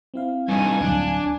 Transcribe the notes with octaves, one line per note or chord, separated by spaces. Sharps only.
C4 E4 F5
G2 D#4 G#5
D1 D2 F#3 D4